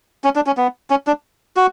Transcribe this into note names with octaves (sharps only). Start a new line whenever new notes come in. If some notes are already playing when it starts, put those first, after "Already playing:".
C#4
D4
C#4
B3
C#4
D4
F#4